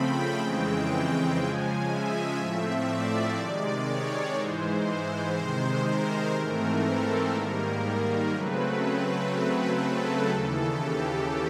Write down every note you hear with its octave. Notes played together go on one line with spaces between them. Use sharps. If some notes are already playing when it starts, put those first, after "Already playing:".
Already playing: C#3 F3 A3 C4 G5 B5
F2 C#3 E3 G#3 C4
C#3 F3 G#3 G#5
E5
A2 F3 A3 C4
D5
C3 D#3 G#3
C#5
G#2 E3 G#3 C5
C5
C3 D#3 G#3 C5
A#4
G#2 E3 A3 C4
A4
G#2 D#3 G3 A#3 A#4
C#3 F#3 A3 C4 B4
C#3 F#3 A3 C4 B4
A4
D#2 C#3 E3
G4